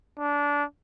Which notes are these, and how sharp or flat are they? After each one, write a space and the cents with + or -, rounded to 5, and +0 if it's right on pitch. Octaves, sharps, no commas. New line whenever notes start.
D4 -20